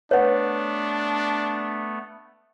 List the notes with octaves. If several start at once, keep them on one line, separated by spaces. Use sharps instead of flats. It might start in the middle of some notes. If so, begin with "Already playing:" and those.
A3 B3 D4 B4 C#5 F#5